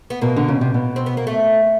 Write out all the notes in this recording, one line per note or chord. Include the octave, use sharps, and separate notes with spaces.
B3
B2 A#3
D3
C#3
C3
B2
C4
B3
A#3
A3